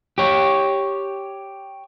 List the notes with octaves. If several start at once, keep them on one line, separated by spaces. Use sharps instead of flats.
G4 C#5